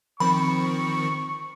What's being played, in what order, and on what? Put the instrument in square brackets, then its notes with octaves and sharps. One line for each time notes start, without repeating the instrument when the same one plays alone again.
[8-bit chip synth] D#3 F3 C4 [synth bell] B5 [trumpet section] C#6